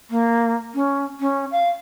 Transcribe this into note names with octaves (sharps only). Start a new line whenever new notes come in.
A#3
C#4
C#4
F5